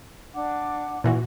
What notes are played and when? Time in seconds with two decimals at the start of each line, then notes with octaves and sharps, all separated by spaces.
0.34 D4 F#5 D6
1.04 A#2 E3 F#4